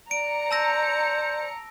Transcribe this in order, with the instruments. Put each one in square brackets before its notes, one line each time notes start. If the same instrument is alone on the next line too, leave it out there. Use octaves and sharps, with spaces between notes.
[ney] D5 [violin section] A#5 C#7 [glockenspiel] D7
[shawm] C5 [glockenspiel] A5 E6 A#6